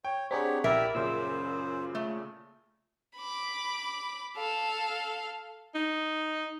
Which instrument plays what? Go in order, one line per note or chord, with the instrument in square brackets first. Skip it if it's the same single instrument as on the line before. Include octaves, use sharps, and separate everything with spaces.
[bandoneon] C#5 [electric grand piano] G5
[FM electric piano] C4 D4 G#4 [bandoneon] G4 C#5 [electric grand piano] F#5 A#5 B6
[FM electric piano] A#1 [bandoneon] E4 G4 D5 [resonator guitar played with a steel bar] A#4 E5
[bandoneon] F#2 C5 [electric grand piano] A#2 C#3 [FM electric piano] E6
[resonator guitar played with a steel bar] A3
[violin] B5 D6
A4 F5
[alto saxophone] D#4